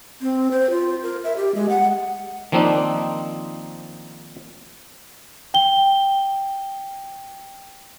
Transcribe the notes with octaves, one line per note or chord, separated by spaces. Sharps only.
C4
C5
F4
A#4
E5
G4
G#3
F#5
D#3 F3 A#3 C4 D4 D#4
G5 G7